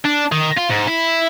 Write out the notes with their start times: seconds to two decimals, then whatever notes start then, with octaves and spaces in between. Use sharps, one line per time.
0.05 D4
0.32 D#3
0.58 F4
0.70 G#2
0.88 E4